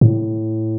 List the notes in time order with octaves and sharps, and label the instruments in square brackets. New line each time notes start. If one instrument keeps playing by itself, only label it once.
[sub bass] A2